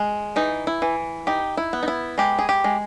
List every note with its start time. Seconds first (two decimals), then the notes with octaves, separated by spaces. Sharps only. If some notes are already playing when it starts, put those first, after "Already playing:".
Already playing: G#3
0.36 E3 D#4
0.67 E4
0.82 E3
1.27 D#4 G4
1.57 E4
1.73 B3
1.83 D#4
1.88 E4
2.18 G#3 G4
2.39 G#4
2.49 G4
2.64 G#3